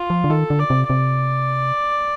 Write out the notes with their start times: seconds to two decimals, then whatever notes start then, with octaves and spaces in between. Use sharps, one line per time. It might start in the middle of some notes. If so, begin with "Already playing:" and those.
Already playing: F4
0.10 F3
0.24 D3
0.30 D#3 A4
0.50 D3
0.59 D5
0.70 C3
0.89 C3 D5